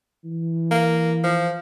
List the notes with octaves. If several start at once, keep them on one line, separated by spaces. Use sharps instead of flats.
E3
A#3
F3